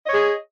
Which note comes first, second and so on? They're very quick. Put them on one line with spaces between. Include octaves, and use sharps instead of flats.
D#5 C#5 G#4